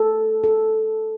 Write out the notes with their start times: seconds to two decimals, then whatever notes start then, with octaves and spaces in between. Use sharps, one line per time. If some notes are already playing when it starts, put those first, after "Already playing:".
Already playing: A4
0.44 A4